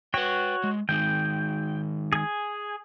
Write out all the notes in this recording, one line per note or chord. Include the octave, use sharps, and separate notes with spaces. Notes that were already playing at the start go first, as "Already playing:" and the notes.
F#4 B4 C#5 G5
G#3
D#3 G#3 D#4 G5
G#4 G#5